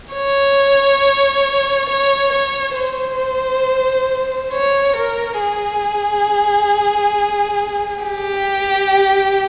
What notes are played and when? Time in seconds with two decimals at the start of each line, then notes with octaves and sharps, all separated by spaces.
0.14 C#5
1.89 C#5
2.32 C#5
2.76 C5
4.52 C#5
4.96 A#4
5.40 G#4
8.02 G4